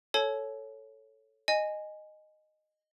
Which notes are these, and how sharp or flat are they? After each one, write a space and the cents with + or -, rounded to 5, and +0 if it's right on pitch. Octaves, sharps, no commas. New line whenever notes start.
A4 +0 C#5 +0 A5 -45
D#5 -10 G#5 +0